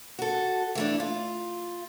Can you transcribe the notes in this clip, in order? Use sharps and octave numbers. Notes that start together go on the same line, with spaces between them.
F#4 A4
E3 A3 D4
F4